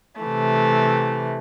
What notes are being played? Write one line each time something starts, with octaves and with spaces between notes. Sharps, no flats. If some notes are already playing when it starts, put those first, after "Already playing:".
C3 E3 A3